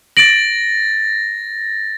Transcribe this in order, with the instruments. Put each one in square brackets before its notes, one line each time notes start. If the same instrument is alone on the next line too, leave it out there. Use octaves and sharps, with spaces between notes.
[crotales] A6 A#6 [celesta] D7 F#7